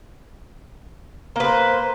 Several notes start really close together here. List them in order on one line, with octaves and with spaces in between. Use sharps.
A#3 B4 C5